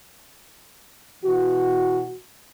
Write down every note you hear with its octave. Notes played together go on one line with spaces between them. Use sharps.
B2 E3 F#4